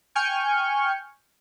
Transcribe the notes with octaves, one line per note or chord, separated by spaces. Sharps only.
G5 G#5 C#6 F6 G6